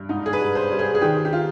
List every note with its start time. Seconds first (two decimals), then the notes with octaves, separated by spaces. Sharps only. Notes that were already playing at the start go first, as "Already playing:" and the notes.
Already playing: G2
0.09 G#2 D#4
0.26 G#4
0.33 B4
0.41 G3
0.55 C5
0.71 G3
0.79 G#4
0.95 G#4
1.01 D#3 G4
1.25 G4
1.33 F4